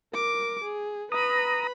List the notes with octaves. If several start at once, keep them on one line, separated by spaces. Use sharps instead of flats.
A#4 D6
G#4
B4 A#5 B5 D#6